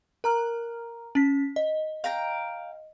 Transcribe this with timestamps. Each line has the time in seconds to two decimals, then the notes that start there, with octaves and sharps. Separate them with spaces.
0.24 A#4 A#5 F6
1.15 C#4 B6
1.56 D#5
2.04 F5 G5 A#5